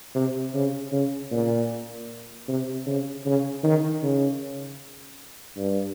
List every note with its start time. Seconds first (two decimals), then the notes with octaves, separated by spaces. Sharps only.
0.15 C3
0.54 C#3
0.92 C#3
1.31 A#2
2.48 C3
2.86 C#3
3.26 C#3
3.64 D#3
4.03 C#3
5.57 G2